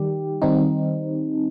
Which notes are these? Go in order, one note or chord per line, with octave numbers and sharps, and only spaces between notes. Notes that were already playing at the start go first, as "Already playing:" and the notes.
Already playing: D#3 G3 G4
D#3 G3 C4 D#4